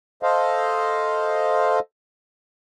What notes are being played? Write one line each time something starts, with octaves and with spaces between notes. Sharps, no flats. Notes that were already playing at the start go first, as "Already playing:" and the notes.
A4 C5 D#5 F5